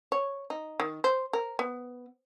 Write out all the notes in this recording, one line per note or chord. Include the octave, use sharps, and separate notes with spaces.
C#5
D#4
D#3
C5
A#4
B3